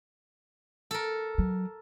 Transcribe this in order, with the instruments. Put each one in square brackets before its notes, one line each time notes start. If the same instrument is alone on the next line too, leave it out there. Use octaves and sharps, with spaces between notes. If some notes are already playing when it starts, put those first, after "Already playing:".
[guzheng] A4 A#4
[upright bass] F#3